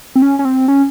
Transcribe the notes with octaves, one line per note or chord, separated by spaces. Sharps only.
C4
C#4
C#4
C4
C#4